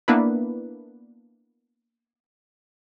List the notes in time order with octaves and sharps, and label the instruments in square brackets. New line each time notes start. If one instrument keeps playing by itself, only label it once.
[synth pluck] A#3 B3 D4 E4 B4